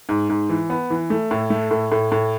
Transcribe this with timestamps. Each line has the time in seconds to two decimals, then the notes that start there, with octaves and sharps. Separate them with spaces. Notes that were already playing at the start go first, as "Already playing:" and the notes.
0.09 G#2
0.30 G#2
0.49 E3
0.70 B3
0.90 E3
1.10 A3
1.31 A2
1.50 A3
1.71 A2
1.92 A2
2.12 A2